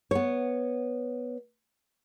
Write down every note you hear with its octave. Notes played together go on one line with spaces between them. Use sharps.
B3 C#5